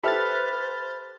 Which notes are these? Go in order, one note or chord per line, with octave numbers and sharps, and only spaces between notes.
G4 A4 B4 C5 E5 B5 F6 A6